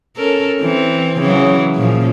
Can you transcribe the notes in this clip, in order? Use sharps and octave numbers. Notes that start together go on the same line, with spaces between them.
C#4 A4 A#4
E3 C4
C#3 E3 F#3
A#2 C#3 F3